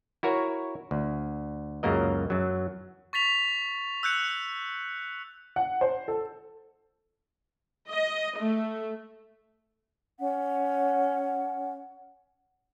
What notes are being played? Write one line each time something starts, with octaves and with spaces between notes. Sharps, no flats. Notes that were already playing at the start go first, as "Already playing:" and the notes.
E4 F#4 A#4 C#5
D2
C#2 F#2 C#3 A#3 A#4 D#5
F#2 F#3
C#6 A6 B6 F7
E6 F#6 G6 C#7
F#5
C5
A4
D#5
A3
C#4 F#5